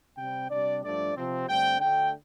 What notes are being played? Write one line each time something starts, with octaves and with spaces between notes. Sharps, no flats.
C3 G3 C4 G5
C3 G3 D4 D5
G2 F3 A3 D4 D5
C3 F3 C4
G2 D3 A3 C4 G5
D2 D3 A3 G5